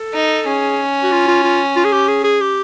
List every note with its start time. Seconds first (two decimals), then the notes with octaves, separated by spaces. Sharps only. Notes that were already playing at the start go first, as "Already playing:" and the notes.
Already playing: A4
0.14 D#4
0.46 C#4 G#4
1.03 F#4
1.11 F4
1.28 F4
1.44 F4
1.76 F4
1.84 G#4
1.92 G4
2.08 G#4
2.24 G#4
2.41 G4